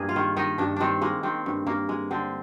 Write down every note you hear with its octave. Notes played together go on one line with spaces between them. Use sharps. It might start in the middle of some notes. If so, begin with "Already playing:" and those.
Already playing: G2 A#3 G#4
F4
D#3
D#3 D#4
G2 D4
D#3 C4 D4
G#3 A#3
D#3 C4
G2
G2 A#3
G#3
D3 C4